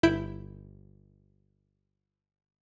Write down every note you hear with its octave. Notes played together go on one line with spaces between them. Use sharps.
G1 E4 G6 D7